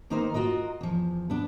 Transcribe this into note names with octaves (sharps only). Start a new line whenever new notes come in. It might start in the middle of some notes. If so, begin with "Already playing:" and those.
D#3 A#3 B3 D#4 A#4 C5
F4 F#4 A#4 D#5
E2 F3
B3 D4